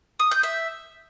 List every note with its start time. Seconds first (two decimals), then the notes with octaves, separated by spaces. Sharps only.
0.19 D#6
0.31 G6
0.43 E5